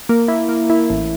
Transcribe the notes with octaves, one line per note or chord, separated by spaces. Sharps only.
A#3
E4
A#3
E4
A1